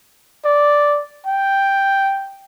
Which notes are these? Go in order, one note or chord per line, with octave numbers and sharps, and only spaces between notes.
D5
G5